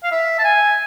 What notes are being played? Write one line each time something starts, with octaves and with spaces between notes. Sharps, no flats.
F5
E5
A5
G#5